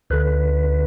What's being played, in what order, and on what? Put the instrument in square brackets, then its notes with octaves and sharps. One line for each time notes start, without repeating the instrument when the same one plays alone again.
[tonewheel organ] D2 D3 B4